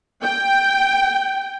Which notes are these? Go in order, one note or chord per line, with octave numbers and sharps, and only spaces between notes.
G5